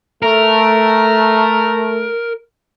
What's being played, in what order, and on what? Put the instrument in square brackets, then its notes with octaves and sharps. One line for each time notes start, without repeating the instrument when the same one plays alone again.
[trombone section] A3 [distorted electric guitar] A#4